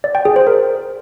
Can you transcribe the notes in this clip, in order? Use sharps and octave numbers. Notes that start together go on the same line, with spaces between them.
D5
G5
G#4
C5
A#4